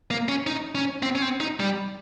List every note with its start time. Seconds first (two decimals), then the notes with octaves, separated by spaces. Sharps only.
0.11 A#3
0.29 C#4
0.47 D#4
0.75 C#4
1.03 C4
1.15 C#4
1.22 C4
1.40 D#4
1.60 G3